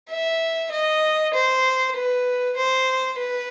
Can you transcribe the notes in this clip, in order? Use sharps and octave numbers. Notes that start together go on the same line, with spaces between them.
E5
D#5
C5
B4
C5
B4